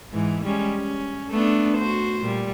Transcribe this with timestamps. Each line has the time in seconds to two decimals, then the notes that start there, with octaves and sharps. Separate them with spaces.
0.12 G#2 E3
0.44 G3 G#3 C#4
0.77 C#4
1.30 A3 B3 D4
1.78 F#4 C5
2.22 A#2 G3